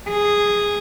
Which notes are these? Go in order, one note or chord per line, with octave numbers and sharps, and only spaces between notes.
G#4